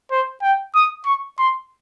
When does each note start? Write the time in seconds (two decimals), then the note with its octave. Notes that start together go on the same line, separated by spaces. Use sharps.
0.11 C5
0.42 G5
0.75 D#6
1.06 C#6
1.39 C6